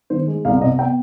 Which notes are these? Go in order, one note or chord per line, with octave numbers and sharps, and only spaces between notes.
D#3 C5
G#3
C2 F5
C3 D#5
B3 G5